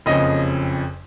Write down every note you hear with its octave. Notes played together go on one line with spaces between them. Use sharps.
F#1 F2 C#3 D#5